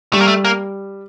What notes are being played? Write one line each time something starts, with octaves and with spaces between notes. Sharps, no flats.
G3 A3
A#3
A3
A#3